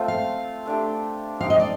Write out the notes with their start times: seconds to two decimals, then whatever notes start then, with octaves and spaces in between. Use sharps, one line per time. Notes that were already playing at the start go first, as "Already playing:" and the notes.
Already playing: A3 C4 F4
0.08 F5
0.66 A3 D4 G4
1.40 C4 D#4 G4 F5
1.50 D#5
1.60 D5